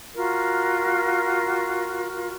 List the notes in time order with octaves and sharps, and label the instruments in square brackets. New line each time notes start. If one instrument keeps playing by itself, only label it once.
[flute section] F4 F#4 A#4